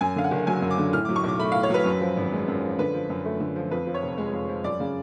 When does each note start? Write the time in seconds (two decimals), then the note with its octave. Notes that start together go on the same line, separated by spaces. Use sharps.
0.01 F#2 G#5
0.16 D3 F5
0.24 F#5
0.31 F#1
0.47 F#3 G#5
0.62 F#2
0.71 D6
0.78 D3
0.93 A2 F6
1.05 F#3 D6
1.16 C#6
1.24 B1 D6
1.39 A3 B5
1.52 A2 F5
1.63 C#5
1.70 F#3 B4
1.85 F#2
2.01 F3
2.17 G#1
2.32 G#3
2.48 F#2
2.63 F3
2.78 D3 B4
2.94 F3
3.10 F#2
3.25 A3
3.40 D3
3.56 F3
3.71 F2 B4
3.87 F3
3.94 C#5
4.02 F1
4.18 G#3
4.33 F2
4.49 F3
4.64 F#2 D5
4.80 C#3